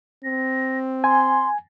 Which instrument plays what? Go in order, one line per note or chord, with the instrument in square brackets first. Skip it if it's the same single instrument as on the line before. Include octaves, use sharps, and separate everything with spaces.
[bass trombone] C4 [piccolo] A#6
[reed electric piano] G#5 [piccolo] C6